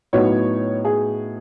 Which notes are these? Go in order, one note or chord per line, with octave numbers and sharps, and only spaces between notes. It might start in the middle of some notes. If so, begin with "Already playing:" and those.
A2 F#3 B3 D#4 C#5
G#4